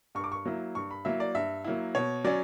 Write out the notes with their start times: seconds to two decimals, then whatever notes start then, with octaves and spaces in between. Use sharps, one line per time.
0.15 G2 C#6
0.24 D6
0.32 C#6
0.46 F#3 A#3 E4
0.75 G2 C#6
0.91 B5
1.05 F#3 A#3 E4 E5
1.20 D5
1.35 G2 E5
1.64 F#3 A#3 E4
1.95 B2 C#5
2.25 F#3 C#4 D5